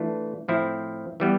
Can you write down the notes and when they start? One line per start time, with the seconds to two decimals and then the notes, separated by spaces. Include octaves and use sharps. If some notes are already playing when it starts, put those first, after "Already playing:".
Already playing: E3 A3 D4 F4
0.48 A2 F3 C4 E4
1.20 E3 G3 B3